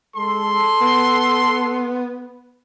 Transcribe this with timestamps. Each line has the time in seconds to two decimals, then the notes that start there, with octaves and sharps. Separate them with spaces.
0.16 G#3 A4 C6
0.81 B3